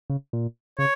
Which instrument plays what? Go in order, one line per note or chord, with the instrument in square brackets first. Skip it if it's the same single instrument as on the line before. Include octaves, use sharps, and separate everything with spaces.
[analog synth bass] C#3
A#2
[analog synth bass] C#3 [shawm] C#5